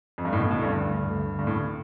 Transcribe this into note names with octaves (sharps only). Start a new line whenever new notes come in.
F2
G2
A2
D2 B2 D3 A3
A2
G2
G2
G2
A2
G2